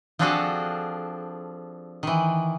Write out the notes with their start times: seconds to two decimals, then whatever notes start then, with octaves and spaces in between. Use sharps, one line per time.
0.19 F3 C4 D4 F#4 G#4 A4
2.03 D#3 E3